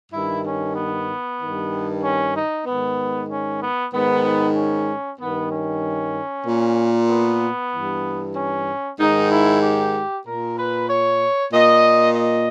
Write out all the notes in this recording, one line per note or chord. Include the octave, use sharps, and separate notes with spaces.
G2 D#3 E4
C#4
B3
G2 D#3
C#4
D#4
G#2 D#3 B3
C#4
B3
G#2 D#3 B3
C#4
G2 D#3 B3
C#4
A#2
B3
G2 E3
C#4
G#2 D#3 D#4
E4
G4
A#2 A#4
B4
C#5
A#2 D#5
D#5